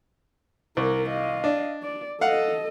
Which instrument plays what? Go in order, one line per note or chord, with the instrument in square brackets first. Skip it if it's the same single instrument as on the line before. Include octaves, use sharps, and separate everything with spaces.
[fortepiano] C2 [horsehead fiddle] A#4
[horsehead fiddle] D#5 F5
[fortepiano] D4
[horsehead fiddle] D5
[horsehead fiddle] A4 D#5 [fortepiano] F5 F#5